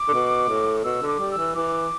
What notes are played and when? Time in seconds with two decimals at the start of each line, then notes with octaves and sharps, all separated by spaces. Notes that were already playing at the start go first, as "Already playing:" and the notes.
Already playing: D6
0.08 D3
0.14 B2
0.49 A2
0.84 B2 E6
1.02 D3
1.08 D6
1.19 G3
1.32 E6
1.38 E3
1.55 E3 D6